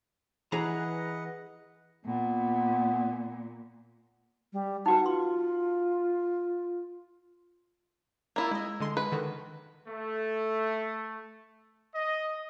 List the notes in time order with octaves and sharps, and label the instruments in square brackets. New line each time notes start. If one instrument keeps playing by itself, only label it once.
[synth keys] E3 [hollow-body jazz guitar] G#4 A#5 [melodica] B4 D#5 F#5
[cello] A#2 [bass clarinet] B3
[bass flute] G3
[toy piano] D#4 F#4 B4 [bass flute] F#5
[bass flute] F4 [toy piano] C6
[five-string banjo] A#3 E4 F4
[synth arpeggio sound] G#3 D#5 [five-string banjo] E4
[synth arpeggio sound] D3 G#3 C6
[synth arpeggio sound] G#3 [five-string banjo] B4
[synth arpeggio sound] D3 D#3 F#4
[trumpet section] A3
D#5